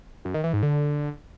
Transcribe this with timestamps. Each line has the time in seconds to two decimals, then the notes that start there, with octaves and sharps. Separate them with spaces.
0.25 F#2
0.34 D#3
0.44 E3
0.53 G#2
0.63 D3